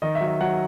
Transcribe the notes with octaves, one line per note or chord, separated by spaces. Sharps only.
D#3 D#5
E5
F#3
E5
F#3 F#5